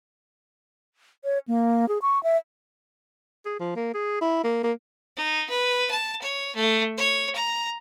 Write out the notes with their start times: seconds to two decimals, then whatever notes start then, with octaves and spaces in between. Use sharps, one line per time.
1.24 C#5
1.48 A#3
1.89 G#4
2.02 C#6
2.23 E5
3.45 G#4
3.59 F3
3.76 A#3
3.94 G#4
4.21 E4
4.44 A#3
4.63 A#3
5.17 D#4
5.49 B4
5.90 A5
6.22 C#5
6.55 A3
6.97 C#5
7.35 A#5